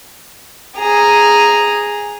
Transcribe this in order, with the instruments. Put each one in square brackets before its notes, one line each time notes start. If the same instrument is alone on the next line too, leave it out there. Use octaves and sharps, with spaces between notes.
[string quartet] G#4 A#5